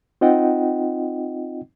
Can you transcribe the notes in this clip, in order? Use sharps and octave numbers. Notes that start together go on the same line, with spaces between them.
C4 D#4 F4 D#5 F#5 G5